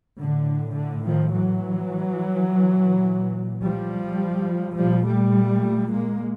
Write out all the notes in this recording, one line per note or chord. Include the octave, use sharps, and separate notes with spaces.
A2 D3
D3
D#3 F3
E3 F#3
A#2
F3 G3
A#2 F3 G3
G3 A3
G#3 A#3